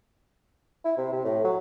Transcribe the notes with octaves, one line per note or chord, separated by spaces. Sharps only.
E4
C3
C3
A2
F#3